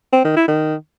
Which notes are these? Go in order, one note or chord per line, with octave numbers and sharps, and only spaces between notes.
C4
D#3
E4
D#3